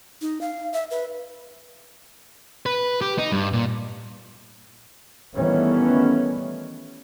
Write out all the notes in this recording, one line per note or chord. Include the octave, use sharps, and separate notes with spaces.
D#4
F5
E5
B4
B4
G4
D#4
G2
A#2
D#3 E3 G3 A3 B3 C#4